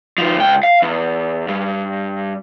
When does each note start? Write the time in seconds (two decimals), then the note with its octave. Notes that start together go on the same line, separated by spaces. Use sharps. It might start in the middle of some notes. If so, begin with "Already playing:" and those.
0.18 D#3 F3
0.38 C#2 G5
0.63 F5
0.82 E2
1.48 G2